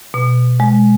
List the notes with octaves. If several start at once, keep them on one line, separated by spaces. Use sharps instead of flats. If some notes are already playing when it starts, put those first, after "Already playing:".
B2
G#3